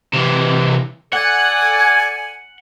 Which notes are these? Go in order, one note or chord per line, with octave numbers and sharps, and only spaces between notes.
C3 E3
A4 D5 F#5 G#5